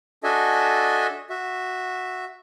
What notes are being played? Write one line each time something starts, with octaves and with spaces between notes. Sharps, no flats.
D4 F#4 A4 D#5 E5 G#5
F#4 E5